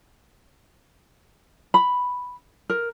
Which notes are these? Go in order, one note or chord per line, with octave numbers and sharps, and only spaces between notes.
B5
A#4